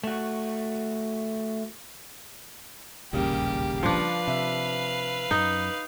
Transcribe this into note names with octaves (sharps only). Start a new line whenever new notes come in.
A3 F#4
E1 A#1 D#2 C#3 G3 A#3 G4
F3 D4 B4 F5
C3 E5
F#2 D#4